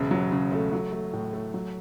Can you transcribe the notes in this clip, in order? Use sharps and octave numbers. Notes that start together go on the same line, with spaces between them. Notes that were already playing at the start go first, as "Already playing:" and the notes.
Already playing: E1 C#3
F#3
C#3
A3
F#3
A3
A2
A3
F#3